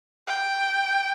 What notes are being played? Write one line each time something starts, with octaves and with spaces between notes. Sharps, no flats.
G5